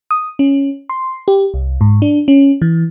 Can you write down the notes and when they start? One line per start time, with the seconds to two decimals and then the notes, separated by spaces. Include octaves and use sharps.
0.11 D#6
0.39 C#4
0.90 C6
1.28 G4
1.54 C2
1.81 G#2
2.02 D4
2.28 C#4
2.62 E3